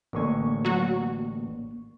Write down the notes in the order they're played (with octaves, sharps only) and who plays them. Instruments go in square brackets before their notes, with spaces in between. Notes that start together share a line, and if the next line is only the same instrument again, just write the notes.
[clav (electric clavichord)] A1 D3 G#5 [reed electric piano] A#3 C#6
[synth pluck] F#3 F#4